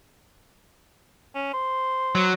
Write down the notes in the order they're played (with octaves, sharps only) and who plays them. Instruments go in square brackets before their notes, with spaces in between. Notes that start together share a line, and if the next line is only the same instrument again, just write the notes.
[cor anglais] C#4
C5
[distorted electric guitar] F#3